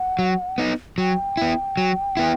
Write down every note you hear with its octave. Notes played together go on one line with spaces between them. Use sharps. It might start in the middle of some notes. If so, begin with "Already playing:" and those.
Already playing: F#5
F#3
B3 D#4
F#3 G5
B3 E4
F#3
B3 E4